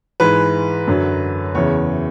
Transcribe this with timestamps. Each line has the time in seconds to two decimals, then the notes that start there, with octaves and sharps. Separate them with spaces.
0.20 G#2 E3 G#3 B4
0.87 F#2 D3 F#3
1.55 E2 C#3 E3 C#5